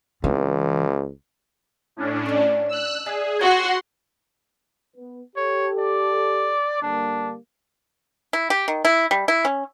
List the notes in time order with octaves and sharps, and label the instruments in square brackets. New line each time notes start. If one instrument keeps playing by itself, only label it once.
[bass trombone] C#2 [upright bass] E3 C4
[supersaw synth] A2 C#4 D4
[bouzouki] D5 A5
[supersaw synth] E6 F#6
[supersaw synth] G#4 [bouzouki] D5 E5 A5
[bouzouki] C#4 G5 [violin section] F#4 [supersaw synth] F#5 C6
[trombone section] B3
[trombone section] G4 A4 [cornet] C#5
[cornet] D5
[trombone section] D3 G3 A#3 [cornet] D4
[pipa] E4
G4
D#3
E4
G3
E4
C#4